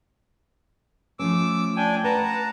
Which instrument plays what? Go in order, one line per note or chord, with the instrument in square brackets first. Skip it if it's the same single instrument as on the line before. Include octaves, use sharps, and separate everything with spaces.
[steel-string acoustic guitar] F3 A3 C#4 [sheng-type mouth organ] D6 E6
[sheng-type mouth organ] D4 G5 G#5
[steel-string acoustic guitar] B4 [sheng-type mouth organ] F#5 A5 A#5